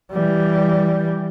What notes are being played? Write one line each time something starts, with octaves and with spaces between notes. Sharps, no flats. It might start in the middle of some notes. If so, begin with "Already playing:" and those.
E3 G3